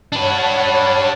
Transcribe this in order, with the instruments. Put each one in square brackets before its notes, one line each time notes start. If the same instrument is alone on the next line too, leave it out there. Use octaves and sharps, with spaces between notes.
[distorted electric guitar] D4 B4 [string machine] C#5 F#5 A5